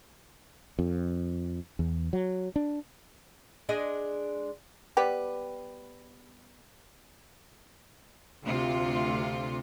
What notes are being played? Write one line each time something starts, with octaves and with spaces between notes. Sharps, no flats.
F2
E2
F#3
D4
G#3 D4 D#5
G3 B3 G4 B4
D2 C3 F4